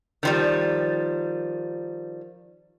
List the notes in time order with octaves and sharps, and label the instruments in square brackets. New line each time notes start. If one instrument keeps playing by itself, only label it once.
[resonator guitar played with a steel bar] D#3 F3 G3